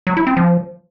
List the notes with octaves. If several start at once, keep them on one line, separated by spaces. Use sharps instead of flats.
F#3
E4
C4
F3